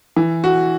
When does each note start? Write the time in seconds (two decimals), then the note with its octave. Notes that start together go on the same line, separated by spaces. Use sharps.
0.16 E3
0.44 F#4